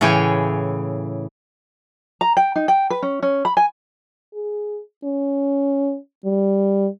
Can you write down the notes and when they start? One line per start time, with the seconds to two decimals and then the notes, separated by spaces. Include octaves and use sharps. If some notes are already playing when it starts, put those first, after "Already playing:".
0.01 A2 C#3 E3 G#4 C#5 G5
2.21 A#5
2.37 G5
2.56 D#4
2.68 G5
2.90 B4
3.03 C#4
3.23 C#4
3.45 B5
3.57 G#5
4.34 G#4
5.04 C#4
6.25 G3